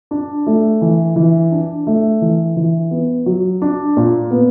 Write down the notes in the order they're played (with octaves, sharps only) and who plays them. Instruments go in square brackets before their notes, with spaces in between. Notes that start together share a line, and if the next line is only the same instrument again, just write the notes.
[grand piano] D4
A3
E3
E3
D4
A3
E3
E3
B3
F#3
D4
A#2
B3